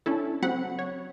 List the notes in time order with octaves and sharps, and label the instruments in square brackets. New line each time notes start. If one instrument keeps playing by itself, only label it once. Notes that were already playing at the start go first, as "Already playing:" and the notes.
[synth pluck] C#4 D4 E4 A4
C#3 F#3 C4 F#4 F#5 B5
C#5